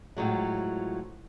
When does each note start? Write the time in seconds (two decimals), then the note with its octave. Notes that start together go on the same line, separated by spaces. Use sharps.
0.17 A2 F3 F#3 G#3